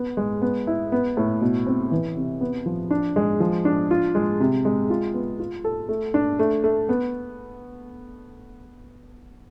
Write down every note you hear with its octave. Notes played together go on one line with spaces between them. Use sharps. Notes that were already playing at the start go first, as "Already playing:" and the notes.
Already playing: B3
G#3
B3
E4
B3
A2
B2
C4
E3
C3
B3
F3
D4
G#3
F3
D4
F4
G#3
C3
G#3
F4
B3
F4
A4
A3
D4
A3
A3
B3